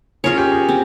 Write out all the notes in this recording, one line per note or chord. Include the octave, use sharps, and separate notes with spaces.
C#4 F4 G#4 A#4 C#5
G4
G#4
C4